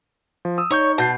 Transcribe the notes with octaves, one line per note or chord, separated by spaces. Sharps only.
F3
D#6 E6
D#4 C#5 C#6 G6
B2 A5 G6 C7